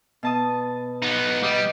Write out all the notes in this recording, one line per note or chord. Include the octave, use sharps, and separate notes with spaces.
B2 A5 D#6
B3 D#4
G3 D#5